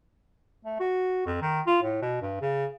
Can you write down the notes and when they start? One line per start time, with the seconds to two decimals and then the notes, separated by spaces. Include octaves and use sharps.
0.65 A3
0.80 F#4
1.26 F2
1.42 D#3
1.67 F4
1.82 A2
2.02 B2
2.22 G2
2.41 C#3